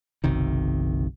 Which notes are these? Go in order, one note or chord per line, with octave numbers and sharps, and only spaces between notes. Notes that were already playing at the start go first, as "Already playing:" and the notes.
F#1 B1 C3 D#3